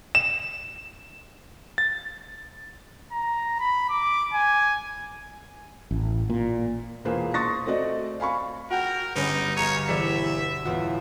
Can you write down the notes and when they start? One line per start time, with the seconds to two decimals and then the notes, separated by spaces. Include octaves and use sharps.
0.15 E7
1.78 A6
3.12 A#5
3.60 B5
3.90 D6
4.33 G#5
5.91 A1
6.30 A#2
7.05 E1 A#2 A#3 G#4 B4 C5
7.34 C6 C#6 D#6 A6 A#6
7.66 A3 C4 F#4 D5 D#5
8.20 F5 G#5 B5 C#6
8.70 F#4 A#4 F#5 G5
9.15 G1 C#4 D#4 B4
9.57 B1 C#5 F5 A#5 D#7
9.89 E1 E3 G4 D5 E5
10.65 A1 E2 F4 F#4 F5